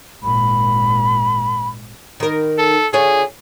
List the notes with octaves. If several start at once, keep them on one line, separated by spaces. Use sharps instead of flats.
G#1 A#2 B5
D#3 A#4
A4
D3 F4 G#4 C#5